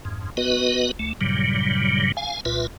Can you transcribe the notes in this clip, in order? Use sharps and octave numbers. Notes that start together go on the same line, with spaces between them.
F2 G#2
B3 F#4 B4 D#5
D2 A3
G2 A#2 C#3 F#3 G3
F5 G#5
C2 A#2 F4 B4 E5